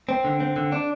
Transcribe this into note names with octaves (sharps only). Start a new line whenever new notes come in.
C4
D3
C4
D3
D4